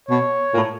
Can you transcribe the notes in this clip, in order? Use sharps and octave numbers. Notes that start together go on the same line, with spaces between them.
B2 C#5
A#2
A2